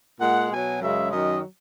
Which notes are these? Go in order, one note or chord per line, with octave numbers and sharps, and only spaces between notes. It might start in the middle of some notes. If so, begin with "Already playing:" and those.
A#2 G#3 F#5
B2 F#3 G#5
F#2 C#3 G#3 E5
F#2 D#3 F#3 D#5